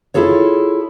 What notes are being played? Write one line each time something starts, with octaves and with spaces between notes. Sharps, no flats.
E4 F4 G#4 A4 C#5